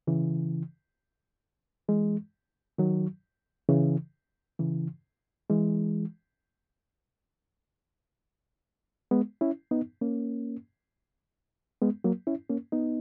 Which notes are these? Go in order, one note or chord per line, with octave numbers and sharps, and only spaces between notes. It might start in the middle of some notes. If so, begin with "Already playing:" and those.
C#3 E3
E3 G#3
D#3 F#3
C#3 E3
C#3 E3
E3 G#3
G#3 B3
C#4 E4
B3 D#4
A#3 C#4
G#3 B3
F#3 A#3
C#4 E4
A#3 C#4
B3 D#4